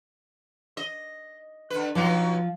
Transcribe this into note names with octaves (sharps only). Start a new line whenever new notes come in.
D#5
D3 B4
B2 F3 F#3 D#4